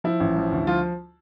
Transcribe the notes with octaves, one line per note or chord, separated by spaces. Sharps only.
F3 E4
A1
F3
D2
F3 F4